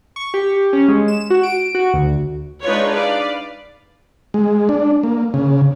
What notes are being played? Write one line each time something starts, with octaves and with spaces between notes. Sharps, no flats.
C#6
G4
C#4
G#3
E7
F#4
D7
F#4
D2
G#3 D4 D#4 F4 B4 C#5
B4 D5 F5
G#3
D4
A#3
C#3